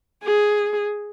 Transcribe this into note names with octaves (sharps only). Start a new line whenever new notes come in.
G#4